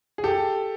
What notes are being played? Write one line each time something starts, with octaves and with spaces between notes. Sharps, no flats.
G#4
G4 A4